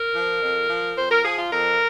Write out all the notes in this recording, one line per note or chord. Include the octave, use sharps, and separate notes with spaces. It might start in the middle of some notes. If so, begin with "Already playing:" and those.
Already playing: A#4
F3
F2
F3
F2 C5
A#4
F3 G#4
F4
F2 A#4